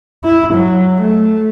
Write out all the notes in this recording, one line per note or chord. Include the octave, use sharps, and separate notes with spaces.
E4
F#3
A3